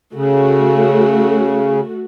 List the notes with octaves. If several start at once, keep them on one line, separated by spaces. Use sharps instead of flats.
C#3 A3 F#4